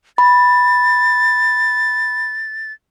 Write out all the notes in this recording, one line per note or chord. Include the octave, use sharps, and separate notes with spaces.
B5 A6